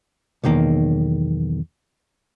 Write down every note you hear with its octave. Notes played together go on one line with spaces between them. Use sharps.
B1 E2 D#3 A#3